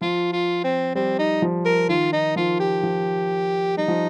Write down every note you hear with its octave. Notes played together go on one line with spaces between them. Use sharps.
F3 F4
F4
C4
G3 C4
D#4
F3
A#4
D#3 F4
D#4
F3 F4
G4
F3
G3 D#4
F3